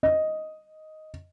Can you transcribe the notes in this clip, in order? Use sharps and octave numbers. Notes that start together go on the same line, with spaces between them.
D#5